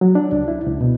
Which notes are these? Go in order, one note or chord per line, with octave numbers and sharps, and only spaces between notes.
F#3
D4
C#2
E4
C#2
B2